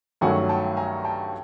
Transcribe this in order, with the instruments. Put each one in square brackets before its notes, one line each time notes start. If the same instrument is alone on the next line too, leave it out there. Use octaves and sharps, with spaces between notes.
[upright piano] G2 D#3 F#3 A3 C#4 [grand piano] F#5 G#5
[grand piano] G5 A5
G#5 A#5
G5 A5